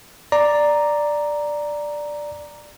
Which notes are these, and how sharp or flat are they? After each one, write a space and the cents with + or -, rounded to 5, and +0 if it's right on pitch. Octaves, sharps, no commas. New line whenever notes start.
D5 +5 A#5 +0